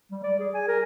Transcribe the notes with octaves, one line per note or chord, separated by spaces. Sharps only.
G3
D5
G#4
G#5
A#4